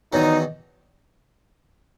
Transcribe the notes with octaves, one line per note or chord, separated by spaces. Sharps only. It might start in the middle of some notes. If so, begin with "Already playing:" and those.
E2 D#3 F#3 D#4